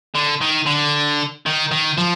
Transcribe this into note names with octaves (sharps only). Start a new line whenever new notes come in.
D3
D#3
D3
D#3
D#3
F3